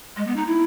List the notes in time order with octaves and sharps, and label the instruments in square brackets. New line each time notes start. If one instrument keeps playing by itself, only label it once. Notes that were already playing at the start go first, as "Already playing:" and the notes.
[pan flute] G#3
B3
D#4
E4